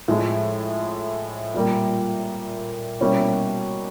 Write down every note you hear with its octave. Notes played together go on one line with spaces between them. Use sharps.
A2 F3 G#3
A#2 G3 A#3
B2 G3 A#3 C#4 E4